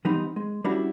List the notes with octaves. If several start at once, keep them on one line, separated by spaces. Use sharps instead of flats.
E3 G3 B3 C4 D#4
G#3
G3 C#4 D4 E4 F#4